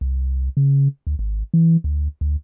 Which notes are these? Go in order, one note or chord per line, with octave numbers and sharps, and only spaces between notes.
C2
C#3
D2
G#1
E3
D2
D2